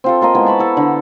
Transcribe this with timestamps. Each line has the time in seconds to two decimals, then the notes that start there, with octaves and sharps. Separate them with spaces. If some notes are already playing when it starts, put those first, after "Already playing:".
0.04 C4 F4 A4
0.21 A#3 F4 A#4 D#5
0.35 G#3 B3 E4
0.46 A5 B5 C#6
0.59 E4 A4
0.77 D3